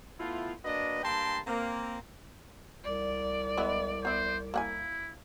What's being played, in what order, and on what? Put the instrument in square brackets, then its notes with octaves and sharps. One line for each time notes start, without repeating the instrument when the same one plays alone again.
[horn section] A3 B3 E4 F4
A#3 D4 F#4 B4 D#5
G2 A#3 G5 A5 A#5 C6
A#3 C4
[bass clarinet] C2 [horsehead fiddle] D5
[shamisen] G#3 B3 E4
[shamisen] B3 E5 [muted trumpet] C5
[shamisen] A#3 F#5 G#5 [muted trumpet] E4